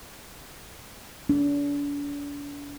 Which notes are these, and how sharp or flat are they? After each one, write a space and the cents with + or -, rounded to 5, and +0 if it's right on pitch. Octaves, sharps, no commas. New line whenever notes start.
D4 -40